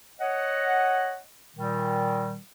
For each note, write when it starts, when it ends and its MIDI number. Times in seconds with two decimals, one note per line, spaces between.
0.20 1.17 73
0.20 1.17 75
0.20 1.17 78
1.57 2.37 46
1.57 2.37 51
1.57 2.37 55